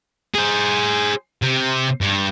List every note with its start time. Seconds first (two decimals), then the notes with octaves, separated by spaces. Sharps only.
0.35 G#4 C5
1.42 C3
2.01 G2